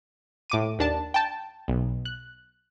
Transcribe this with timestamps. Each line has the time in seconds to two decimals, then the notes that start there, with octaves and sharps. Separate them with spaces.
0.50 A2 D6 D#7
0.79 D#2 D4 A5
1.14 G5 A5
1.68 B1
2.05 F#6